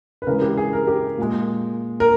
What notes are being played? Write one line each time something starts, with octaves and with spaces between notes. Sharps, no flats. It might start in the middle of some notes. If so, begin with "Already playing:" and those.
B4
C#3 E3 G#3 A#4
G4
G#4
A#4
G4
A#2 G#3
A#4